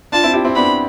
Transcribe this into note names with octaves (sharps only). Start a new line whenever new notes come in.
D4 F4 A5
C4 E4
E4 G4
C4 E4
B3 D4 B5